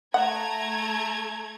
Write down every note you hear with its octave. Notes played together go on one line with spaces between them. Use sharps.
A3 F#5 A#5 G#6